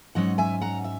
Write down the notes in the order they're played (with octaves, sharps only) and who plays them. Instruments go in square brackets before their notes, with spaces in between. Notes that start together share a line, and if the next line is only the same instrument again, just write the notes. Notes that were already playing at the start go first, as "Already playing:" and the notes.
[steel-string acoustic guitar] G#2 F#3 C#4 D#5 F#5
E5 G#5
F#5 A#5
E5